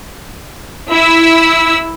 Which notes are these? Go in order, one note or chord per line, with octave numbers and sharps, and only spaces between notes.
E4 E6